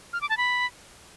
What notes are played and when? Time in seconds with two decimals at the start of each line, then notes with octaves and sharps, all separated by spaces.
0.13 F6
0.21 D6
0.29 A5
0.38 B5